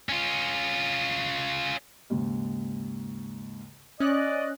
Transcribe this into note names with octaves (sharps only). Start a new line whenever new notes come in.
C#4 F4
D#2 G#2 C#3
C#4 D5 D#5 F#6